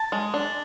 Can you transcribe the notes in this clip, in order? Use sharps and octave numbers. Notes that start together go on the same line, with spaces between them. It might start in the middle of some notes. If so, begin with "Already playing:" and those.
Already playing: A5
G#3
D4